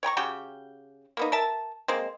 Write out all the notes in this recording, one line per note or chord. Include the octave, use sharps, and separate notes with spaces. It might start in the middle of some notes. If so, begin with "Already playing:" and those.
C#5 G5 A#5 C#6
C#3 F#4 G4 G5
A#3 B3 D#4
A#4 E5 A5
G#3 A#3 C4